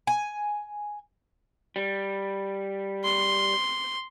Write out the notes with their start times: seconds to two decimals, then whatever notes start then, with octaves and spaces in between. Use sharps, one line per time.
0.07 G#5
1.76 G3
3.04 C6